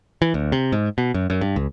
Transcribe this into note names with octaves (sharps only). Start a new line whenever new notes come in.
E3
D2
C3
G#2
B2
F#2
F#2
G2
C#2